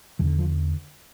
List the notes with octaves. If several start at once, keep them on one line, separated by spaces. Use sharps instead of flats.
E2 D3 E3
F3